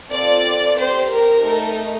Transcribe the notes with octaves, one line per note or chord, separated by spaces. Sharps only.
C4 F4 A4 D5
C4 G4 C5
A#4
A3 D#4 A4